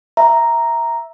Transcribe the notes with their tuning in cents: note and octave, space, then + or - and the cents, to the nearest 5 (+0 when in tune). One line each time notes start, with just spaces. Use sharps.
E5 +0 A#5 +0